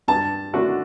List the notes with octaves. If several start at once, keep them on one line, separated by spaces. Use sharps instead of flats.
G2 A5
D3 A3 D4 F#4